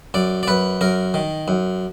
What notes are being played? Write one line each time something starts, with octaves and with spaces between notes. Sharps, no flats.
F#2 D5
D5
F#2 B4
F#2 A#4
D#3
F#2